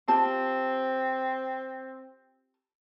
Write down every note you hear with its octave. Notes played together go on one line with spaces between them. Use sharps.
C4 F4 G4 A5